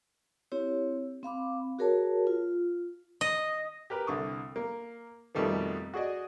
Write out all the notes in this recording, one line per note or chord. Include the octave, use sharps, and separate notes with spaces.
C4 E4 G4 C#5
C4 F5 B5 D6
F#4 G#4 A#4 C#5 A5
F4
D#5
G4 A#4 B4
C2 D3 C#6 D#6
A#3
F2 B2 D#3 G3 A3 B3
F#4 G#4 D5 D#5